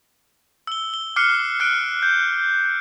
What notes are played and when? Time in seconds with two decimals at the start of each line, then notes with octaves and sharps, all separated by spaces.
0.67 E6 G7
0.94 G7
1.16 D6 F6 F#6 C7 C#7
1.60 F6 F#6 D7
2.02 G6